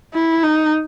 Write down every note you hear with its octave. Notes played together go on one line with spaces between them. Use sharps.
E4
D#4